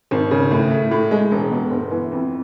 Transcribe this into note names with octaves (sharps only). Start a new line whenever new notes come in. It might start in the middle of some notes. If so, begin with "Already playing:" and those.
G#1
C#3
A2
A3
A2
G#3
E1
B2
G1
E3
F2